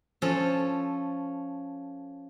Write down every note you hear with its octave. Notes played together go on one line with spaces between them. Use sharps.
F3 C#4 A4